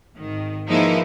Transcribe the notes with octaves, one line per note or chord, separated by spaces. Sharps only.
G#1 D#3
E3 F3 G#3 A#3 D#4 E4